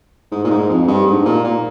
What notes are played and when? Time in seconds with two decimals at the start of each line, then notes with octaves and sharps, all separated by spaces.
0.32 G#2
0.44 A#2
0.51 G#2
0.69 F2
0.88 G2
1.07 G#2
1.25 A#2
1.44 A#2